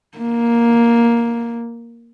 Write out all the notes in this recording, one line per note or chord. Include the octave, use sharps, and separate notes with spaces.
A#3